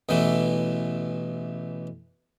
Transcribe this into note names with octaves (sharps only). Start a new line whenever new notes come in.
A1 B2 E3 A3